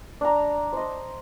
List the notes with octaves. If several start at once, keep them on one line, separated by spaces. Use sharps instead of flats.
D4 A#5
C5 D#5